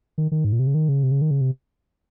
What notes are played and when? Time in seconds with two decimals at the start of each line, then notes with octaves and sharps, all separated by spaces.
0.18 D#3
0.32 D#3
0.45 G#2
0.52 A#2
0.59 C3
0.67 C#3
0.74 D#3
0.89 C#3
1.03 C3
1.11 C#3
1.22 D#3
1.31 C#3
1.41 C3